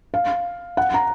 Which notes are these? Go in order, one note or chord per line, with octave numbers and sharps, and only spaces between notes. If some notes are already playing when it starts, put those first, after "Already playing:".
F5
F#5
A#5